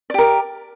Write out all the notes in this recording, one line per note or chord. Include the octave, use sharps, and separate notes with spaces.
G4 A#4 D5